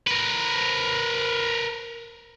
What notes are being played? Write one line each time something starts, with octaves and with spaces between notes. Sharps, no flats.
A#4 B4